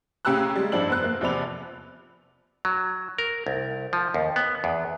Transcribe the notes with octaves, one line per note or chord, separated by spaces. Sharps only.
C#3 C#4 G4 A#5 E6 F#6
G3 G#3
G2 F3 D4 E4 E6 F#7
F1 B3 C5 F#6
A#3
E2 C3 F3 D5 B5 F7
F#3
A#4
C2
F3
D#2
B3
E2